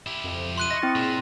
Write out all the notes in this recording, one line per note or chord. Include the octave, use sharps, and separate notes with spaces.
E4 G4
F2
C6 F#6 D#7
D#5 C#6 A#6
C4 E4 A6
A#2 G#4